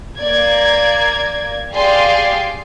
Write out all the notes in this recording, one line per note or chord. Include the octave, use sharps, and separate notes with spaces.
A#3 D5 G#6
G4 G#4 D5 F5 C6